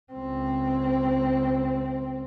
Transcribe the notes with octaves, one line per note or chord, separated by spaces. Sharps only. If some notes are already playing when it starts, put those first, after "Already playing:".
C#2 C4